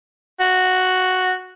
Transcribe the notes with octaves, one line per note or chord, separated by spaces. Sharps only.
F#4